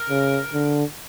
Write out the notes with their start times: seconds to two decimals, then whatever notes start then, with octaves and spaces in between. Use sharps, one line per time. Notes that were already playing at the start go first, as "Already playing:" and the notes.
Already playing: A#4
0.10 C#3
0.54 D3